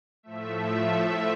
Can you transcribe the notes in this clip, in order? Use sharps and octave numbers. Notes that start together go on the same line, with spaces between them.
A2 F3 A3 E5